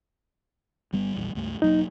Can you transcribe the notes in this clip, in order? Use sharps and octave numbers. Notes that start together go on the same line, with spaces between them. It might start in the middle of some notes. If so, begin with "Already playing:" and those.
G1 G3 B3
A#1 E2 G3
C#2 G2 A3
E1 F#3 A#3 D#4